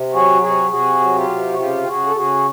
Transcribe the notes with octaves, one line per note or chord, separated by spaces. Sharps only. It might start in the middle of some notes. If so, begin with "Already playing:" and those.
Already playing: C3
F#3 F#4 G#4
C3 F#4 G#4
C3 F#4 G#4
F#3
F4 G4
C3
F#4
C#3 F4 G4
G4
C#3 F#4 G#4
A4
C#3 F#4 G#4